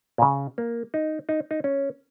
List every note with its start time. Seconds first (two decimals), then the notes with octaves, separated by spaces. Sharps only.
0.18 A#2
0.22 C#3
0.58 A#3
0.94 D#4
1.29 D#4
1.51 D#4
1.64 C#4